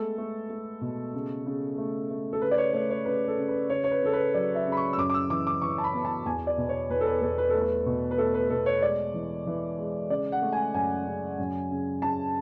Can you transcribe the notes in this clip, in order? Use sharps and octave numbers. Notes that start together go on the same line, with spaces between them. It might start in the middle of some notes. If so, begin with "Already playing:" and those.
Already playing: G#3 A3 B3 A4
A3
A3
B2
C#3
C#3
A3
A3
A4
C#3 B4
D5
C#5
A3 C#5
C#5
C#3 B4
A4
C#3
B4
C#3 C#5
C#5
B4
C#3 A4
B4
F#3 D5
E5
C#3
B5
C#6
E6
F#2 D6
D6
E6
E3 D6
D6
E3 C#6
A5
B5
B3
A5
E2 G#5
D5
B2
C#5
E2 B4
A4
B4
E2 A4
B4
A3 A4
B4
B2
B4
A3 A4
B4
B2 A4
C#5
G#3 D5
E3
E3
G#3
C#3 D5
F#5
A3
G#5
F#2 G#5
C#3
F#2
C#3
C#3 A5